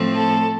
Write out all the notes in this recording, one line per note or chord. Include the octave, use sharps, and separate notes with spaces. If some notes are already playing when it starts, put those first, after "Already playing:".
Already playing: A2 F3 A3 C4
A4